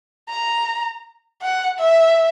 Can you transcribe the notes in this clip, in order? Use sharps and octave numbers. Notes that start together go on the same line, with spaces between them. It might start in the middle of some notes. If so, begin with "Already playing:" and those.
A#5
F#5
E5